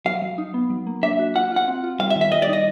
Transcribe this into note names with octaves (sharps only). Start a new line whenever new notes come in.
F#3 F5
F#3
D#4
B3
F#3
A#3
D4 E5
F#4
F4 F#5
F4
F#5
C4
F4
G3 F5
E5
D#3
E5
G3 D#5
D5
D#4 D#5